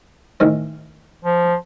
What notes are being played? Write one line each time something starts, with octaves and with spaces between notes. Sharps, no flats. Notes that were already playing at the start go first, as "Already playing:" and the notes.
A1 D#3 C5
F3